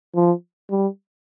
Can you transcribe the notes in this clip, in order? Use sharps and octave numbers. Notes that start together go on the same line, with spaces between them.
F3
G3